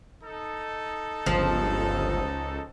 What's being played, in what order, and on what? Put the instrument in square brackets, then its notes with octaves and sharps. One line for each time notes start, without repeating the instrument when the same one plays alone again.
[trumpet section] D#4 A4
[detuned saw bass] G1 [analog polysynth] C#2 [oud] F3